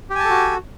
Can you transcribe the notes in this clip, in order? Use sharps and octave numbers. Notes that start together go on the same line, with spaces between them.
F#4 G4 A4 G#5 A5